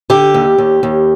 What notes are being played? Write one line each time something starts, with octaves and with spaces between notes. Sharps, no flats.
D3 G4
D#2
D#2
D#2